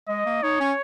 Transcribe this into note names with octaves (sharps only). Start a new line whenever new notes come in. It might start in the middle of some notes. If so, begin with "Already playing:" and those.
G#3 D#5
A#3
D#4 C#5
C#4